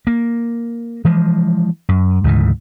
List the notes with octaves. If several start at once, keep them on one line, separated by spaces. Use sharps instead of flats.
A#3
E3 F3 G#3
F#2
D2 G#2 C#3 E3